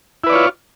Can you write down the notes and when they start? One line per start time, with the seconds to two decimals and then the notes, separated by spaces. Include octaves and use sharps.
0.24 E4
0.27 B4
0.30 D5
0.33 C#5
0.35 F4